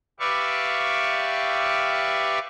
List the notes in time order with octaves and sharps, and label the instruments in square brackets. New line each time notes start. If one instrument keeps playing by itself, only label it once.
[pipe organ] G4 B4 D5 E5 F5 C#6